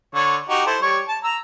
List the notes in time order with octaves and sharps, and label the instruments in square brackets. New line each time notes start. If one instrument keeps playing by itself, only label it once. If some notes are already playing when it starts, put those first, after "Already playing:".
[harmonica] D3 C#5
D#4 F#4 G4
E4 A4 C5
G3 C#5
A5
A#5 E6